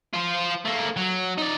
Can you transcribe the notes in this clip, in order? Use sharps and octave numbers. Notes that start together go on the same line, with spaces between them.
F4 C5
A3 A#3
F#3
D#4 D5